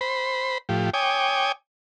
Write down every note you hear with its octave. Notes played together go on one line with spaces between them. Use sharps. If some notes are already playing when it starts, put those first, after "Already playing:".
C5 B5
A2 F3 G4
C#5 G5 G#5 D6 D#6